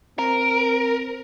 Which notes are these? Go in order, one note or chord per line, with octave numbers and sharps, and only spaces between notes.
C4 A#4